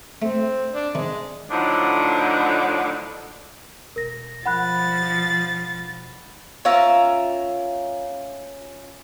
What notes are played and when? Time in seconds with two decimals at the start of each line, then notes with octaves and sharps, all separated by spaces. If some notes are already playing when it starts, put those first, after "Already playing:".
0.22 A3 C4
0.72 D4
0.95 C3 D#3 G#3
1.51 A2 D3 F3 F#3 D4 D#4
3.96 E1 A#4 A#6
4.46 F3 F#5 B5 F#6 A6
6.65 C#4 F4 A#4 E5